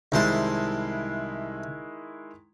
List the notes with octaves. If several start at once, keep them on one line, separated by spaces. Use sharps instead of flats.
C2 D#3 G#3 E4 C5 A5